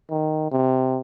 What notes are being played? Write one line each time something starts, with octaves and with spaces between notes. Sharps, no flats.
D#3
C3